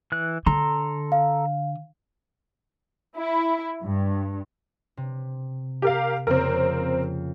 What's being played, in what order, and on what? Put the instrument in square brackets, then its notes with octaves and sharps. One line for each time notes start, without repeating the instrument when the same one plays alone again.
[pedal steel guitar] E3 F#6
[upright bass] D3 [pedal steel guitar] A4 A#5 C6
[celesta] F5
[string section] E4
G2
[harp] C3
[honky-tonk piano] G4 A#4 F5
[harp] F2 C#3 A#3 [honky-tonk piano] C4 A#4